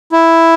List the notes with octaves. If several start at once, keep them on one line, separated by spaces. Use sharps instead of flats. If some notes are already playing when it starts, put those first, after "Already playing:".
E4